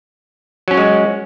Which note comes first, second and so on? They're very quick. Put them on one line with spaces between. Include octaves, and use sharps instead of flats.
F#3 C#4 F#4 G#3